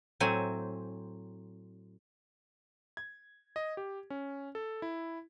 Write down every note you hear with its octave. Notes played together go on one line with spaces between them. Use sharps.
A2 F#3 C4 G#5
G#6
D#5
G4
C#4
A4
E4